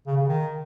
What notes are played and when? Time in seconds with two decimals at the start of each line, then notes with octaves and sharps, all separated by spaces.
0.07 C#3
0.17 C#3
0.28 D#3